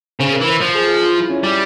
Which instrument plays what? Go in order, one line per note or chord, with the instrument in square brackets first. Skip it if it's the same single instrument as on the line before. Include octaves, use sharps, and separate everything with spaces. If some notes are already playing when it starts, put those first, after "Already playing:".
[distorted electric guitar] C#3 [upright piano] C5
[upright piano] A#4
[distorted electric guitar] E3
[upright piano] C5
[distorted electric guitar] F3 [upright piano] C5
[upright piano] G#4
G#4
F4
E4
C#4
[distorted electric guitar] G3